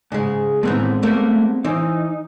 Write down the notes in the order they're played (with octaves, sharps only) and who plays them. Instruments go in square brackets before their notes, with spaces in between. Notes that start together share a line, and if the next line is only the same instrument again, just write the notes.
[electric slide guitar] G#2 [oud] C#3 G#3
[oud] A2 D#3 E3 [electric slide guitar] G#3 B3 C4
[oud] G3 A3 A#3
[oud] E3 C5 [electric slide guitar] D#4